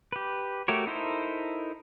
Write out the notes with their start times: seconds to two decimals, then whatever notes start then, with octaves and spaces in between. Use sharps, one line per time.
0.12 G4 B4
0.68 A3 F#4 G4 A#4 C#5
0.87 D#4 E4 A4 A#4 C5